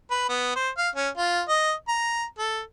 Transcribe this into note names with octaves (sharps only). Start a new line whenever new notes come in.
B4
B3
C5
F5
C#4
F4
D#5
A#5
A4